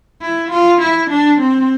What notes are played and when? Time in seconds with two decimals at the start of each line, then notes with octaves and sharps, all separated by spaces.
0.22 E4
0.51 F4
0.81 E4
1.11 D4
1.41 C4